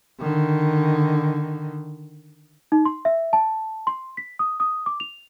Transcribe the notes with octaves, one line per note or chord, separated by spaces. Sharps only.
D3 D#3
D#4
C6
E5
A5
C6
B6
D#6
D#6
D6
F7